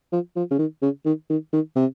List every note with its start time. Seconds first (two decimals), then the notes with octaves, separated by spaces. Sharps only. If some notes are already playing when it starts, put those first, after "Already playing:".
0.12 F3
0.36 F3
0.51 C#3
0.59 D#3
0.82 C#3
1.05 D#3
1.30 D#3
1.53 D#3
1.76 C3